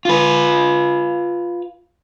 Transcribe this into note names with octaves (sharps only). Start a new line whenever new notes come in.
F4 B4